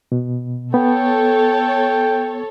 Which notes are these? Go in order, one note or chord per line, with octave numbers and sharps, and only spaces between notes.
B2
B3 A4 C#5 G5